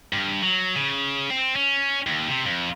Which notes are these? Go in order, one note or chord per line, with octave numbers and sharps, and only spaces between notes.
G2
F#3
C#3
C4
C#4
D#2
C3
F2